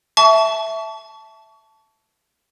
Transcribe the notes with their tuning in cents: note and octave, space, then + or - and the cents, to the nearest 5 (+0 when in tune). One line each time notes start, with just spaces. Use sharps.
E5 +0 A5 -5 C#6 +35